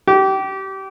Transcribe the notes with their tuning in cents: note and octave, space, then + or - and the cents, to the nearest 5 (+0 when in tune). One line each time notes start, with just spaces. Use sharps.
G4 -25